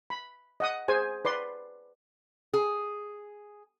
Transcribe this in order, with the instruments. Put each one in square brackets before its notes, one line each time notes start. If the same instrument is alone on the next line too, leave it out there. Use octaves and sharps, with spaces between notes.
[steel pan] B5
D#5 F#5 D#6
G#4 C5 G#5
B4 D5 C6
[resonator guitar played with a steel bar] G#4